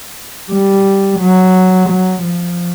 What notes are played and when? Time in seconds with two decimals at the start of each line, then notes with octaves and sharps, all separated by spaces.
0.52 G3
1.20 F#3
1.90 F#3
2.23 F3